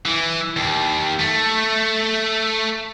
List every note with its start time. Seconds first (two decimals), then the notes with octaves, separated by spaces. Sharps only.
0.06 E3
0.57 D#2
1.19 A3